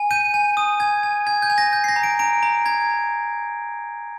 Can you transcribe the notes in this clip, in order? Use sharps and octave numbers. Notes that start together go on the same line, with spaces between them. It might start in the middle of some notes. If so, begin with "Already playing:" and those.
Already playing: G#5
G6 D#7
G#5
D#6
G#5 G#6
G#5
G#5 G#6
G6
G#5
A#6
G6
C7
A#6
A#5
D7
A#5 D7
A#5
A#5 G#6